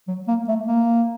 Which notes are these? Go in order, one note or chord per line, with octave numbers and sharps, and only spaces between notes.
F#3
A#3
A3
A#3